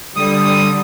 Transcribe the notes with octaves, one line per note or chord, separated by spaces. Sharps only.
D3 G3 D#6